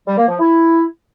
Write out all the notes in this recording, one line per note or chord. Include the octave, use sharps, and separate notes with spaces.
G3
A#3
F3
E4